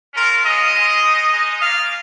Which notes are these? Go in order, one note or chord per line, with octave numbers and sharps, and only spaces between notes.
G#3 C#4 F4 A#4
G#3 C#4 F4 D#5
G#3 F4
G#3 D#4
G#3 D#4
A#3 F4 F5